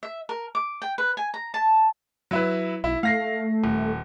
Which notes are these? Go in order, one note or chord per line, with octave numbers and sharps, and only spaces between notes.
E5
A#4
D6
G5
B4
G#5
A#5
A5
F#3 E4 B4
B1 E4
A3 F5 A#6 C7
D#1